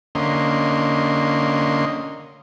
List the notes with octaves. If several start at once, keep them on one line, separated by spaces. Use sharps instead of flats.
D3 A#3 C#4 D#5 C6